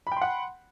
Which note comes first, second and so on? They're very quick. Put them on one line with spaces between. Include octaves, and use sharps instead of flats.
B5 G5 C6 F#5